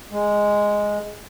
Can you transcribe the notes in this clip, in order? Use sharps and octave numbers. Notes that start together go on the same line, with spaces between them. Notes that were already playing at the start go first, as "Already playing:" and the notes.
G#3